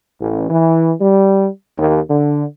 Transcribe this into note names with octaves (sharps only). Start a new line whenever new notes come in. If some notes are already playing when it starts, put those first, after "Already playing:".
A1
E3
G3
D#2
D3